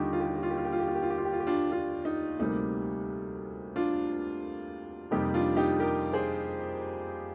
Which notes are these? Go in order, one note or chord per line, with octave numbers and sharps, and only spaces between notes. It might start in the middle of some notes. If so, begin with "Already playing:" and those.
Already playing: D#2 D3 G3 A#3 D4 D#4 F4 G4
F4
G4
F4
G4
F4
G4
F4
G4
F4
G4
F4
G4
F4
G4
F4
G4
F4
G4
D4 F4
D4 F4
D#4
D2 C3 G3 A#3 D#4
D4 F4
F2 C3 G3 A#3 D#4 G4
D4 F4
D#4 G4
G4 A#4
G#4 C5